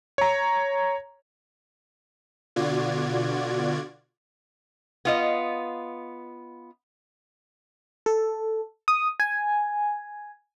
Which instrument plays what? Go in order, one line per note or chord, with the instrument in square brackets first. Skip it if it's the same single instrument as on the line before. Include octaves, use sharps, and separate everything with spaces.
[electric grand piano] C#5 A#5
[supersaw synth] B2 D3 F4 F#4 D5 G#6
[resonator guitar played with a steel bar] B3 F4 D#5
[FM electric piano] A4
D#6
G#5